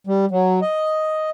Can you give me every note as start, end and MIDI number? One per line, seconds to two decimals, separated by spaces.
0.07 0.25 55
0.31 0.60 54
0.62 1.30 75